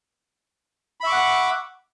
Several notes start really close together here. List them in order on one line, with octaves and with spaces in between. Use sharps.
B5 E5 C#6 D6 F#5